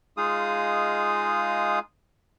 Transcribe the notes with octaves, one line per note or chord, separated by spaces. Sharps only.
G#3 D#4 F4 G#4 F5 D#6